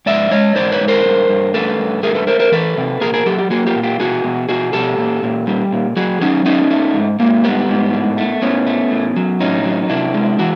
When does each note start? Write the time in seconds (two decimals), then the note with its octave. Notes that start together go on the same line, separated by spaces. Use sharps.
0.06 G#2 D5 E5
0.31 G#3 C#5 D#5
0.55 G#2 C5 D5
0.72 B4 C#5
0.80 G#2
0.88 A#4 C5
1.05 G2
1.29 G2
1.54 A3 A4 B4
1.78 G2
2.03 A3 G#4 A#4
2.15 A4 B4
2.27 A3 A#4 C5
2.40 A#4 C5
2.52 E3 A4 B4
2.77 C3
3.01 A#2 G#4 A#4
3.14 G#4 A#4
3.26 F#3 G4 A4
3.39 G4
3.50 A#3 F#4 G#4
3.67 F4 G4
3.75 A#2
3.83 F4 G4
4.00 B2 F#4 G#4
4.24 B2
4.49 B2 F#4 G#4
4.73 B2 G4 A4
4.98 A#2
5.23 A#2
5.47 G3
5.72 A#2
5.96 F#3 F#4 G#4
6.21 F#3 C#4 D#4
6.45 A3 C#4 D#4
6.70 A3
6.95 G#2
7.19 G#2 A#3
7.44 G3 B3
7.69 G#2
7.93 A2
8.18 A3
8.42 A2 B3 C#4
8.67 A3
8.91 A2
9.16 F#3
9.41 A2 C#4 D#4
9.65 F#3
9.90 C3 D4 E4
10.14 G#3
10.39 E3 E4 F#4